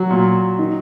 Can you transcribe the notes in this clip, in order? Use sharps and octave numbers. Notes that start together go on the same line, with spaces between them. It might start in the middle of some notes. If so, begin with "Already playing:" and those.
Already playing: F#3 F#4
A#2
D#3